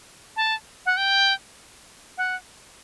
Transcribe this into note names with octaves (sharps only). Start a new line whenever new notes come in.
A5
F#5
G5
F#5